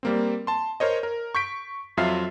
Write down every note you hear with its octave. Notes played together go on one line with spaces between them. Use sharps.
G3 A#3 C4
A5 C6
A#4 C5 C#5 D#5
A#4
C#6 G6 B6 D7
F2 F#3 F4 E5 F6 C7